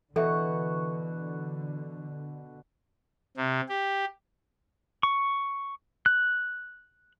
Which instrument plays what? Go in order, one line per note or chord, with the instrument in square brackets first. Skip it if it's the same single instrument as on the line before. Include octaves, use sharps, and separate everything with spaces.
[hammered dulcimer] B2 F#4 C#6 [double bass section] D3 [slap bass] E3 [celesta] A4 E5
[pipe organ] C3
G4
[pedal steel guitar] C#6
F#6